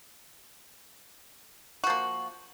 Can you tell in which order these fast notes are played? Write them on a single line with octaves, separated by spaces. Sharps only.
F#4 F3 A#3